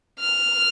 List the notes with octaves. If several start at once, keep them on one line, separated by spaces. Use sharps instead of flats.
F6